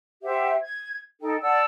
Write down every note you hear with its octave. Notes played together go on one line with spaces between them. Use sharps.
G4 C5 E5 F#5
G#6
D#4 A4 G5
D5 F#5 A5 E6